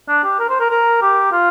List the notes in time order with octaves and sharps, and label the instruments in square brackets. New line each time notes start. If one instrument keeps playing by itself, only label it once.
[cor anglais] D4
G4
A#4
C5
A#4
A#4
G4
F4